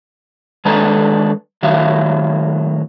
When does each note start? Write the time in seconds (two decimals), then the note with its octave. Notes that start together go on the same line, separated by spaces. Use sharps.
0.65 D#3 G#3 D4 A4 B4 A#5
1.63 A2 D#3 F#3 E5 F5